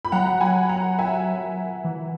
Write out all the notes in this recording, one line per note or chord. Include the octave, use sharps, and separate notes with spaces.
B5
F#3 F#5 A#5
G#5 B5
F#5 A#5
E5 G#5
E3